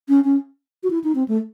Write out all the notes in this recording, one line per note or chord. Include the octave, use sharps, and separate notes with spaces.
C#4
C#4
F#4
E4
D#4
C4
A3